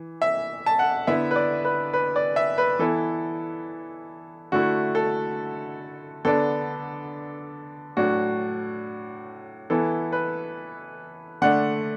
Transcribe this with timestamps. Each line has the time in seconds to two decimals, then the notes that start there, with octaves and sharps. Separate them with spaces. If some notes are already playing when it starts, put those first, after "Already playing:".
Already playing: E3
0.22 E5
0.66 A5
0.79 F#5
1.07 D3 B3 E4 E5
1.31 B4
1.36 D5
1.65 B4
1.94 B4
2.16 D5
2.36 E5
2.58 B4
2.79 E3 B3 E4 A4
4.52 D3 A3 E4 F#4
4.95 A4
6.25 D3 B3 D4 A4
7.97 A2 F#3 D4 F#4
9.70 E3 B3 E4 A4
10.12 B4
11.42 D3 A3 D4 F#5